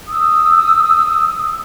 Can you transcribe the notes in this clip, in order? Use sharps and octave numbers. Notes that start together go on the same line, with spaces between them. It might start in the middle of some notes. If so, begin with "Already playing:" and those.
D#6 E6